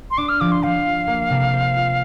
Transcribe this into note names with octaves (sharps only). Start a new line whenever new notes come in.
C6
D4 D6
F6
F3 D6
C6
F3 F5
F4
A#3
C3
C5
F4